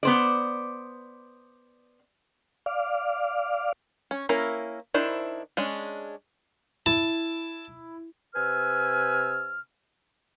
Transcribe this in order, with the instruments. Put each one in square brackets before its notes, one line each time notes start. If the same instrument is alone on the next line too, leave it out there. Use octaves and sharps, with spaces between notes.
[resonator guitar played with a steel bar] B3 C5 D5
[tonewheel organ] D5 F5
[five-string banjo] C#4
A#3 C#4 E4 A#4
D#3 D4 E4 C5
G#3 C#4 D4
[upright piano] E4 [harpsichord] A5
[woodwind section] C3 B4 G#5 E6 F6